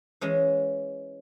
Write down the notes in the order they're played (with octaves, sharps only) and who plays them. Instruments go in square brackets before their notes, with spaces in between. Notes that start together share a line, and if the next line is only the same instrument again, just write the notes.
[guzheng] E3 G#3 C#4